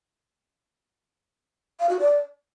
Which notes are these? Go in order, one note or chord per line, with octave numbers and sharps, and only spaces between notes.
F5
F#4
D5